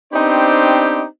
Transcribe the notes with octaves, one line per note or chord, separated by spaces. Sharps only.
B3 C4 D4 D#4 G4 C5